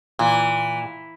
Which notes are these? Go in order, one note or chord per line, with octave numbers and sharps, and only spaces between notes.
A#2 E3